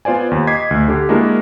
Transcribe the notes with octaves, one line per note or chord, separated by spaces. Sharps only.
B3 F4 C5 D5 G#5
D#2
D#5 D6 G#6 B6 C7
D2
D3 G4
G#3 A#3 D4 E4 F#4 A#4